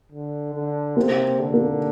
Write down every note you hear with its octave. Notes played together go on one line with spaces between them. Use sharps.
D3
D3
C3 A#3
D3
A#3